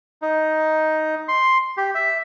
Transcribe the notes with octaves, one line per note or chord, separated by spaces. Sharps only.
D#4
C6
G4
E5